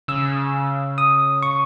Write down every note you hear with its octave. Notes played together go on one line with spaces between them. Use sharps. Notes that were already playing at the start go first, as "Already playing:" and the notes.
C#3 E6
D#6
C#6